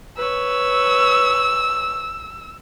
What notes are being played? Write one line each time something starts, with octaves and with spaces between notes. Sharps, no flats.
B4 C#5 E6